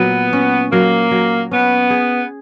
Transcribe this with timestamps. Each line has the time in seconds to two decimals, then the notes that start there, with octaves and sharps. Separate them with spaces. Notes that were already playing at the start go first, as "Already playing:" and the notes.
Already playing: A#2 F#3 B3
0.33 C#4
0.72 F#3 A#3
1.11 F#3
1.51 B3 C#4
1.90 G#4